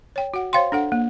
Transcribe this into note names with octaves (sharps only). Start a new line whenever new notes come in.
C#5 G5
F#4 F#5
C5 C#5 F5 G5 C6
D4 A4 F#5
A#3